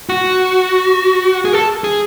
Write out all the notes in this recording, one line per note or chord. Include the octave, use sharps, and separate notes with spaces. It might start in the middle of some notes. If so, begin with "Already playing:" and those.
F#4
G#4
A4
G#4